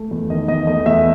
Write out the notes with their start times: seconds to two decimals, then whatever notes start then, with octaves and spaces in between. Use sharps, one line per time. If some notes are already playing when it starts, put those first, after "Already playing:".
Already playing: A3
0.11 E2
0.30 D#3 D#5
0.48 E2 D#5
0.67 A3 D#5
0.86 E2 E5